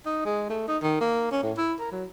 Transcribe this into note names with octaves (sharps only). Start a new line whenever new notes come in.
D#4
G#3
A3
D#4
D#3
A#3
C#4
A2
E4
A#4
F#3